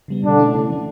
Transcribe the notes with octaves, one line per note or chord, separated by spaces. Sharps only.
C#3 G3 B3
B2 D3 D4
A3 C#4 E4
C#3
E3 A3